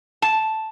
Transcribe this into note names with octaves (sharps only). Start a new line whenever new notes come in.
A5